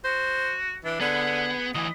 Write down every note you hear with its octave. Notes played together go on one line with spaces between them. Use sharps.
F#4 C5
E3 D4
D3 B3 G#4
D2 E3 D#5